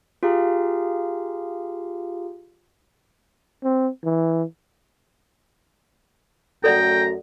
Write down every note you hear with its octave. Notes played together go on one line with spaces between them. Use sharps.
F4 G4 G#4 F5 A#5
C4
E3
F#2 A3 F#4 A4 D5 F#5 G5 A#5